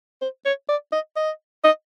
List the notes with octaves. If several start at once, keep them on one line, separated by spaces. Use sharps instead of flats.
C5
C#5
D5
D#5
D#5
D#5